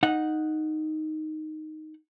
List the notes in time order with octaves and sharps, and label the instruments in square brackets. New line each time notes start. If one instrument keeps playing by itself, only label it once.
[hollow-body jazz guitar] D#4 F#5